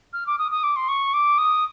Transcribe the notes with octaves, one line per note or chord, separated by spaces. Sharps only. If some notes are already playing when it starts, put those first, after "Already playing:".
F6
D6
D#6
D#6
D6
C6
C#6
D6
D#6